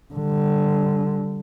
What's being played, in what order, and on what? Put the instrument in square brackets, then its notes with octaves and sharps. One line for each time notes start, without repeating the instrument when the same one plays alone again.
[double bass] D3 G3